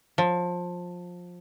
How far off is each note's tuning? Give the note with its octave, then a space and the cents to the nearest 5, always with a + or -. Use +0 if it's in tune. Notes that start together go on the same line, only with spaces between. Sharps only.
F3 +20